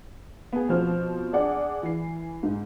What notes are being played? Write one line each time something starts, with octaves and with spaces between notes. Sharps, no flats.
B3 G#4
B2 F3 C4 C5 F6
D4 G#4 D5 F#5
E3 C7
G#2